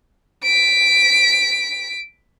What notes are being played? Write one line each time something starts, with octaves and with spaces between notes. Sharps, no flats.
B6 D7